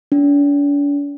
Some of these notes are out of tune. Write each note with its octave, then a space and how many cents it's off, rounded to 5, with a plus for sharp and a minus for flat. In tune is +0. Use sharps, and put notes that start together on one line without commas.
D4 -45